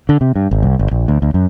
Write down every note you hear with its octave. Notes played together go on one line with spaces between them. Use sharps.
D3
C3
G2
G#1
C2
G1
A#1
D2
D2
F#2